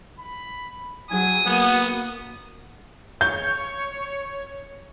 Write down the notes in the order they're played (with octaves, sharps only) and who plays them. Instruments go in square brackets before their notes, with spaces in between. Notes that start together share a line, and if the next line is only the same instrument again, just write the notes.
[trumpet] B5
[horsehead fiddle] F#3 G#4 [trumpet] G#5 [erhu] D#6
[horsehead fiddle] A#3 F#4 [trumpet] B3
[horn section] C#5 [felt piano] G6